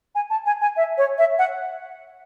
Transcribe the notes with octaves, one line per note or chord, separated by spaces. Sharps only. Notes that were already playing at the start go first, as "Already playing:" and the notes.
G#5
A5
G#5
G#5
E5
C#5
E5
F#5